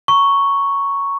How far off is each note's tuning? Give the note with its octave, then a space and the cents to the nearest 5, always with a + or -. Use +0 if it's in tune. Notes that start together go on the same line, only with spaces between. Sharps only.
A#5 +0 C#6 +0